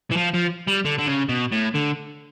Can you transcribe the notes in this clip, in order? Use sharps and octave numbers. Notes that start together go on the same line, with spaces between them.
E3
F3
F3
G3
D3
D3
C#3
B2
A2
D3